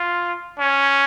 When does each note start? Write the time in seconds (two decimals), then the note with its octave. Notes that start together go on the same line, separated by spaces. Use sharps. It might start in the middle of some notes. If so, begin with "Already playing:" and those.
Already playing: F4
0.59 C#4